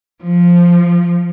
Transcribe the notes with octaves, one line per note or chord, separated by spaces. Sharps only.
F3